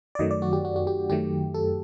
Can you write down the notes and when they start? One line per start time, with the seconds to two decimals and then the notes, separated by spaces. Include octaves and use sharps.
0.15 D5
0.19 F#2 D#3 F#3 A3 D#5
0.31 D5
0.42 F#4
0.53 G4
0.65 F#4
0.76 F#4
0.87 G4
1.10 F#2 D#3 F#3 A3 G4
1.54 A4